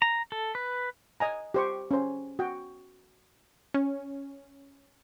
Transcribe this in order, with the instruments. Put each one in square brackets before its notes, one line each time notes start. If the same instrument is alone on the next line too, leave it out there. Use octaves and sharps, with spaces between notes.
[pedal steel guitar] A#5
A4
B4
[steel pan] D#5 G#5 A#5
G4 C5 C#6
C#4 C5
F#4 G5
[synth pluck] C#4